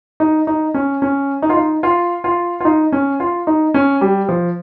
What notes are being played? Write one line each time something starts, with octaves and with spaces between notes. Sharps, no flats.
D#4
D#4
C#4
C#4
D#4
F4
D#4
F4
F4
F4
D#4
C#4
F4
D#4
C#4
G3
F3